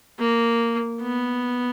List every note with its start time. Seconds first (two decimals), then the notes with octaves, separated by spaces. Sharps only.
0.19 A#3
1.02 B3